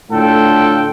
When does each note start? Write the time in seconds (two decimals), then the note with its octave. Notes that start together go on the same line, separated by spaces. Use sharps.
0.11 A2 D3 F4 A4 G5